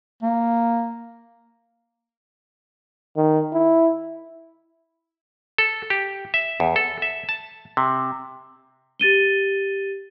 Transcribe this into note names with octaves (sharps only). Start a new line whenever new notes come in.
A#3
D#3
E4
A4
G4
E5
E2
A4
E5
A5
C3
G4 A6 D#7 G7